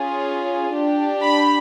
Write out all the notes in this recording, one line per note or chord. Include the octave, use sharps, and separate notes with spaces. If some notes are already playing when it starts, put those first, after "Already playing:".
Already playing: C#4 F4 G#4
D4 G4
B5